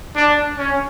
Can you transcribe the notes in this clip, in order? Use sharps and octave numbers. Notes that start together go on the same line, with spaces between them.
D4
C#4